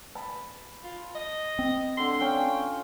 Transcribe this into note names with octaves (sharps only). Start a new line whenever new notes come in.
A5 B5
F4
D#5
C4
D3 A4 C6
C#4 F4 C#5 G5